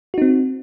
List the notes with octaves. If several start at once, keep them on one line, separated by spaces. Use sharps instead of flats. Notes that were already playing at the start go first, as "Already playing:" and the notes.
C4 D#4 F#4